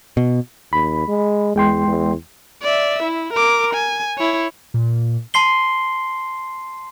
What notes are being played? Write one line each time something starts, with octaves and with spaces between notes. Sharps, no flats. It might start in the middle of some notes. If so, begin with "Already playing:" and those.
B2
D#2 B5
G#3
E2 G#3 G5 C6
E2
D5 E5
E4
A#4 D6
G#5
E4 C#5
A#2
A5 C6 C7 G7